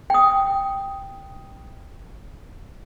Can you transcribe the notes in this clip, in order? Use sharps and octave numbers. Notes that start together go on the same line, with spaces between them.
G5 D#6